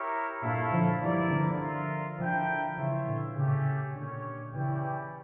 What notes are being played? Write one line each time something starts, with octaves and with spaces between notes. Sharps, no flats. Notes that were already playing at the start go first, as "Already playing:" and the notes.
Already playing: E4 G4 A#4 C#5
G2 A#2 E4 A4 C#5 F5
D3 F3
E3 G3 E4 A#4 D5
D3 F3
F4 A#4 E5
D3 F3 E4 A#4 E5 G5
C#3 E3 F4 C#5 E5
A#2 D3
A2 C#3 A3 C#4 G4
A#2 D3 C#4 G4 C#5
C#3 E3 C#4 E4 G4 D5 G5